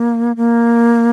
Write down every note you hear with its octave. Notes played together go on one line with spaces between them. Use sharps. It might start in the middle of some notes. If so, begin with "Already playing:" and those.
Already playing: A#3
A#3